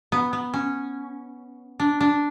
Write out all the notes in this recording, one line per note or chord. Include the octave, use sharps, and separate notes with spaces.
B3
B3
C#4
D4
D4